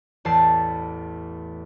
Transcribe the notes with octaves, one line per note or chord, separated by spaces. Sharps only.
A1 E2 A5 C7